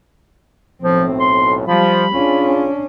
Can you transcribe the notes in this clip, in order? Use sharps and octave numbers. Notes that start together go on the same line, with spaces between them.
B1 A2 F3 C4
C6
F3 G3 B5
C#4 D4 F4 G#4